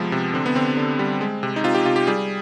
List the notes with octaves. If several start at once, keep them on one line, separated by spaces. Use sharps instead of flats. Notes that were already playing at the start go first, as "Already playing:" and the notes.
Already playing: C3 F3 G#3 B3
C3
D3 C4
B3
D3 C4
D3
G3
G#3
C3
D#4
C3 F4
G4
C3 F4
G4
G3 G#4